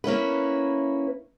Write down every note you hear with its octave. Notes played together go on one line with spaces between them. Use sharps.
A#3 C#4 E4 B4